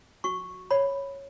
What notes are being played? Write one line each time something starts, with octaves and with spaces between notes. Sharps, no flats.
F#4 C#6
C#5 B5